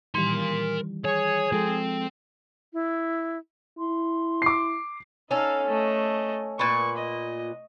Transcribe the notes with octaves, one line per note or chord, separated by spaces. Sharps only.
D#3 E3 G3 A#4 C6
G#4 C#5
F3 G#3 C4 A4
E4
E4 C6
D6 C7
C#4 D#4 A4 F5
A3 D#5
A#2 B4 C#6
D#5